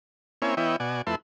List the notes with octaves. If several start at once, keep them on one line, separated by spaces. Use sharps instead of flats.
A#3 C4 C#4 E4 C#5 G#5
E3 B3 E4 C#5 D#5 G5
B2 F#4 D5 G#5
F2 A3 E4 B4 A5 C6